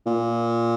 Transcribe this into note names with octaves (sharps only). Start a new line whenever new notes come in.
A#2